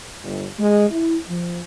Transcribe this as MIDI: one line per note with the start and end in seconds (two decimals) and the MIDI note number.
0.23 0.45 31
0.59 0.86 56
0.90 1.16 64
1.28 1.60 53